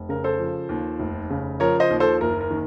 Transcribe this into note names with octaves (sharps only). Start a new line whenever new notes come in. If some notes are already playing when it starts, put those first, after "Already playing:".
Already playing: F1
C#3 A#4
A4 C5
F3
D#2
F1
C#3
F3 A#4 C#5
C5 D#5
D#2
A4 C5
F#1 A#4
A#4
D#3